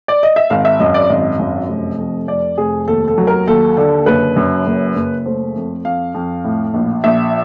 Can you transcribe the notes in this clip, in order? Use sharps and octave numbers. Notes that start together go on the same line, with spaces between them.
D5
D#5
E5
G#1 F5
E5
F#2 D#5
D5
G#1 D#5
F#2
F1
F2
F2 D5
F1 G#4
D#2 A4
A4
F#3
A#4
D#2 A4
D3 A4
F#1 B4
F#2
F#1
F#1
A3 C5
F2
F2 F5
F2
A2
A#1
A#1 E5